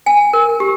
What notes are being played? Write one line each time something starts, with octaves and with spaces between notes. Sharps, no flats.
G#5
A#4
G4